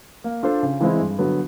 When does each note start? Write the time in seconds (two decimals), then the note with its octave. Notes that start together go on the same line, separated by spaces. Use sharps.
0.24 A#3
0.43 D4 F4 A4 C5
0.63 C#3
0.80 E3 G#3 C4 E4
1.00 G2
1.19 D3 F#3 B3